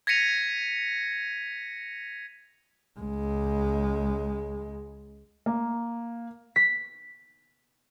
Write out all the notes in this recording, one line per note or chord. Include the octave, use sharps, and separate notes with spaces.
G#6 A#6 B6 C#7 D#7 F7
C#2 G#3
A#3
B6